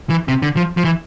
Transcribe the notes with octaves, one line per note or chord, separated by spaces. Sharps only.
E3
C3
D3
F3
F3
E3